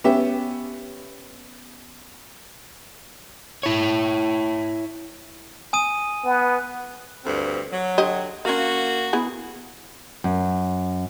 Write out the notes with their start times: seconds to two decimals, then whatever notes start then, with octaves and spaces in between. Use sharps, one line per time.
0.04 B3 C#4 G4 E5
3.63 E4 C#5
5.73 G#5 D#6 D#7
6.24 B3
7.24 D2 G2 C4
7.71 F#3
7.98 D3 G4 D#5
8.45 A#3 C#4 F#4 F5
9.13 B3 E4 G#4
10.24 F#2